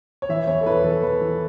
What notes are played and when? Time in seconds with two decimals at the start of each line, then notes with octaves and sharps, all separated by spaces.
0.22 C#5
0.29 E3 E5
0.47 E2 C#5
0.61 A4
0.66 E3 B4
0.84 E3 A4
1.03 E3 B4
1.21 E3